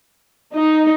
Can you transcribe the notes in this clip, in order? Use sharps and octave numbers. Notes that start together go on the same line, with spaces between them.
D#4